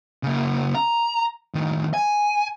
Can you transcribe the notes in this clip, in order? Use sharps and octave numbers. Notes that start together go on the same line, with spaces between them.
C#3 A#3
A#5
A2 D#3
G#5